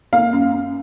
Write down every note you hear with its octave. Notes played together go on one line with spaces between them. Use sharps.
A#3 F5
F#2
F#2